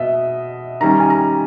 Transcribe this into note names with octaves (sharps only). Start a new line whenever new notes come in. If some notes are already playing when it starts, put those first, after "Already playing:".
Already playing: B2 D#5 E5
D#3 G3 C#4 A#5
G#5
A#5